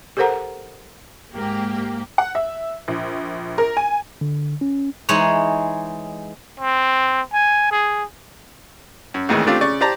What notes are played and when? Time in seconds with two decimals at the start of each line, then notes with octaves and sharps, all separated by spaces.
0.17 G4 A4 A#4 C5 F#5 A#5
1.33 G#2 A#3 G4
2.18 F#5
2.35 E5
2.88 A#1
3.58 A#4
3.77 G#5
4.21 D3
4.61 C#4
5.09 E3 G#3 D#4 G#4 C#5
6.60 C4
7.33 G#5
7.71 G#4
9.14 F#2
9.29 A#1 F2 A2 D#3 E3 G#3
9.47 A3 C4 D4 F4 G4
9.61 C#3 D5 C#6
9.81 G4 C5 D5 A5 A#5